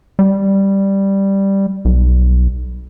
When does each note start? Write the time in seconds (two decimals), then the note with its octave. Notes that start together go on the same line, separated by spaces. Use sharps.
0.19 G3
1.85 B1